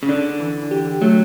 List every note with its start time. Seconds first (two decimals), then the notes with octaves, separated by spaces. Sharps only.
0.03 C#3
0.09 D3 D4
0.40 E3
0.71 G4
1.02 F#3 A3